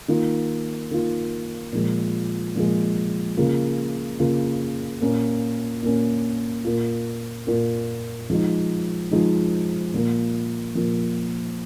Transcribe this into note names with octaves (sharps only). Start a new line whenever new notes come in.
D#3 A#3 F4
D#3 A#3 F4
A#2 F3 G#3
A#2 F3 G#3
C#3 A#3 F4
C#3 A#3 F4
A#2 A#3 C#4
A#2 A#3 C#4
A#2 A#3 F4
A#2 A#3 F4
F3 G#3 D#4
F3 G#3 D#4
A#2 F3 A#3
A#2 F3 A#3